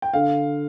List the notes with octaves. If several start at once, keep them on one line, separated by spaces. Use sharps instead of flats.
G5
D3 F5